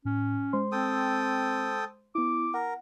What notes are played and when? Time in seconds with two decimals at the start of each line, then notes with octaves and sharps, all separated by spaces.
0.05 A2 C#4
0.53 G#3 C5 C6
0.72 C4 A4 G5 D#6
2.15 B3 E4 D6
2.54 A#4 F#5